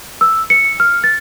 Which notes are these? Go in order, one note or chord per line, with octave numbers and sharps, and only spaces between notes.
E6
C#7
F6
A6